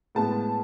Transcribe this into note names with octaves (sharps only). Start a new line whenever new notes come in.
A2 G#3 B3 A5